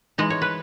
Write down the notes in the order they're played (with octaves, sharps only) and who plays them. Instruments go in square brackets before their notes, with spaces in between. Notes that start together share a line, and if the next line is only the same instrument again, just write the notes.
[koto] E3 G#3 D#4 D#5
C#5
B4